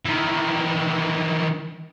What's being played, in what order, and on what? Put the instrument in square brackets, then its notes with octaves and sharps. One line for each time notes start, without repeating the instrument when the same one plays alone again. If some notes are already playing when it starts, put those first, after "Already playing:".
[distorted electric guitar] D#3 E3